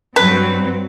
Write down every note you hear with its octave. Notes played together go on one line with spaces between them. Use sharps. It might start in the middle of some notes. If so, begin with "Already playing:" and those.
G2 F#3 C4 B4